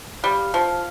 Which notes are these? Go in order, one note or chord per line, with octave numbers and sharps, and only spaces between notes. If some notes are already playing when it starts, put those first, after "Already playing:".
G3 F5
F3